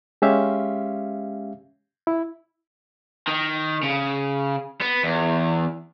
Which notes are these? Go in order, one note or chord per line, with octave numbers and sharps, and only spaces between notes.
G#3 C#4 G4 E5 F5
E4
D#3
C#3
B3
E2